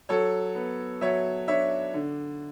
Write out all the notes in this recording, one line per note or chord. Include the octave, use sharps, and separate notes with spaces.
F#3 A4 C#5
B3
F#3 C#5 E5
D4 C#5 E5
D3